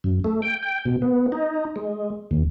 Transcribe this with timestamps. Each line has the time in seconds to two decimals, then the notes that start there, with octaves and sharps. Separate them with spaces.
0.04 F#2
0.24 A3
0.42 G5
0.63 G5
0.85 B2
1.02 B3
1.32 D#4
1.76 G#3
2.31 D#2